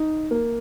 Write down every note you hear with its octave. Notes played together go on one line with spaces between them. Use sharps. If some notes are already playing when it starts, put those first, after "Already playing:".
Already playing: D#4
A#3